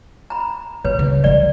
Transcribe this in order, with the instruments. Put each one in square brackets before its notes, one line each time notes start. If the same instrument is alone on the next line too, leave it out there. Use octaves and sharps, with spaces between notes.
[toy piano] A#5 B5
[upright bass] A#2 [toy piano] B4 C#5
[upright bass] C#3
[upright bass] F3 G#3 [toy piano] D5